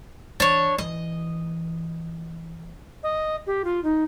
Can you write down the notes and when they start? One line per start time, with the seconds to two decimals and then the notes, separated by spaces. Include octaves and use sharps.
0.40 E3 D4 C#5
0.78 E3 D#5
3.03 D#5
3.47 G4
3.64 F4
3.84 D#4